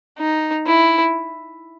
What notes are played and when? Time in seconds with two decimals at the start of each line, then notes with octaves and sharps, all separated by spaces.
0.19 D#4
0.66 E4